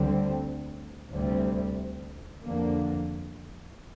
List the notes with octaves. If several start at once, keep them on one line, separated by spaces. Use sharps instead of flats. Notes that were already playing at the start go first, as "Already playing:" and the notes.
Already playing: D2 D3 G3 C4
D2 C3 G3
F2 D3 A#3